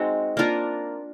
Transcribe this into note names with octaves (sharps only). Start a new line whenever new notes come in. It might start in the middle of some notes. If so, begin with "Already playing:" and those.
Already playing: G#3 C4 D#4 F#4
A#3 D4 F4 A#4